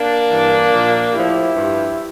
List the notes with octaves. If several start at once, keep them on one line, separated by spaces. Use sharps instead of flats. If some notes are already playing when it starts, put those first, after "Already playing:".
Already playing: A#3 D4
G2 E3
A#2 F3
A2 F3 E4 G4
G2 F3